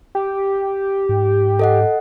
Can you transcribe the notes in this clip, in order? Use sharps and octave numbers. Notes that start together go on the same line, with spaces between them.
G4
G#2
A4 D#5 F#5